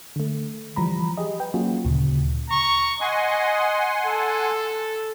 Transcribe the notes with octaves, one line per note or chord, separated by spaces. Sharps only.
D3 A3
E3 F3 G3 A#5 B5
G4 G#4 D#5
B4 G5
F#3 A#3 C#4 F4 F#4 G#4
D2 A#2 C#3
A#5 C#6
D#5 F#5 G#5 C6
A4